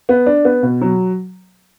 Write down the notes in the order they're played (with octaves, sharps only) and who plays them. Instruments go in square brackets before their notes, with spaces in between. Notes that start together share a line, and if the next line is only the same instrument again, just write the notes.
[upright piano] B3
D4
B3
B2
F#3